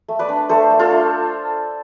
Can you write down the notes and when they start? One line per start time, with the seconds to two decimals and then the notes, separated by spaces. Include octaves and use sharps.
0.08 A3
0.19 B4 D5
0.29 D4
0.49 A3 A4 C5
0.70 A3
0.79 F4 A4
0.91 D4